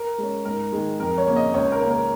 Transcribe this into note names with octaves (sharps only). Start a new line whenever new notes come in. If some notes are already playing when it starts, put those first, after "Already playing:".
Already playing: A#4
G#3 C#4
G#2 A#4
D#3 G#3
F2 A#4
C#5
C#3 A#3 C#4
D#5
C#2 C#5
A#4
C#3 A#3 C#4
A#4